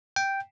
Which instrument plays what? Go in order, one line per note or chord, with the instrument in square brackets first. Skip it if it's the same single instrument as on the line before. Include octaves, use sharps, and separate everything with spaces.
[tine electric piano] G5